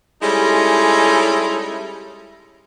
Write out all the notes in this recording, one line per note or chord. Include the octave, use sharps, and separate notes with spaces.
G3 G#3 C#4 D#4 E4 A4